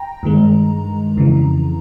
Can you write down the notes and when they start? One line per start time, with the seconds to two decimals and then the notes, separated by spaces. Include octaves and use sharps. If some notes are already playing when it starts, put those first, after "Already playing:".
Already playing: G5 A#5
0.23 G2 D#3 G#3
1.17 F2 C#3 E3